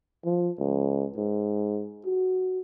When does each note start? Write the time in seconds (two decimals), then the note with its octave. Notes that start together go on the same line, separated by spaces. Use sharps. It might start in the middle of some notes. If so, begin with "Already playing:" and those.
0.25 F3
0.59 C#2
1.17 G#2
2.05 F#4